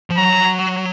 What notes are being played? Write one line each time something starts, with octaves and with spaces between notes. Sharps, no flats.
F3
F#3 A#5